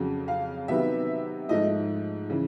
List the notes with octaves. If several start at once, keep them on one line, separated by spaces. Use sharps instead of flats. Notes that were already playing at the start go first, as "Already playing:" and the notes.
Already playing: F2 C#3 F#3
F5
C3 D#3 F#3 B3 E5
G#2 F3 A3 D#5
C#3 E3